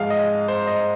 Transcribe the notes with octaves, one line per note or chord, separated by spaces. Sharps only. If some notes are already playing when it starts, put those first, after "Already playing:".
Already playing: G#2 F3 G#3 F5
D#5
C5
D#5